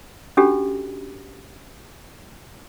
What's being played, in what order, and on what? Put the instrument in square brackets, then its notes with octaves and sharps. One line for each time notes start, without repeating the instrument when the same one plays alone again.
[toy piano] C#4 D4 F#4 G4 A4